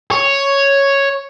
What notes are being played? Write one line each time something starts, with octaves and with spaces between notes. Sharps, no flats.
C#5